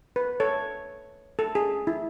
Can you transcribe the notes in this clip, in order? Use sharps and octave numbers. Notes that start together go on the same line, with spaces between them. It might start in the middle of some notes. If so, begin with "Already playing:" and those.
B4
A4 C#5
A4
G#4
E4